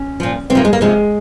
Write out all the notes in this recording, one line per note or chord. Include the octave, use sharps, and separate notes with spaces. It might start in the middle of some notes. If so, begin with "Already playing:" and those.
Already playing: C#4
A#2 F3
C3 C4
F3 A#3
G#3
A#3
C3 F3 G#3